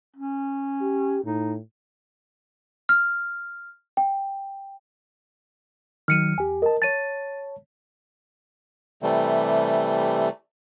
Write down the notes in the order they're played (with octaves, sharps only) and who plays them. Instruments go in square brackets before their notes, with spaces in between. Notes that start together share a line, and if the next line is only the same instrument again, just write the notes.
[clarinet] C#4
[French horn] G4
[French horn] A2 [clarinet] D#4
[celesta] F6
G5
[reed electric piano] D#3 F#3 [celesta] F6 C#7 D#7
[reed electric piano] E2 G4 [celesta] G#5
[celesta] A#4 [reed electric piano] D#5 A5
[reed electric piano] C#5 A5 [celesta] A6 D#7
[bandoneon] C3 E3 G3 A3